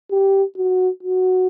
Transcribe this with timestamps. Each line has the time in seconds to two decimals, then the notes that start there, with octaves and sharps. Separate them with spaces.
0.11 G4
0.57 F#4
1.03 F#4